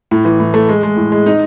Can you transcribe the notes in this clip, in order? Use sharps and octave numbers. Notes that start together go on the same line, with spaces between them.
A2
E3
A2
A3
G#3
G#3
A2
G#3
D#4